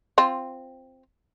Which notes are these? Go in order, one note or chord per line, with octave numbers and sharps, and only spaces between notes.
C4 F4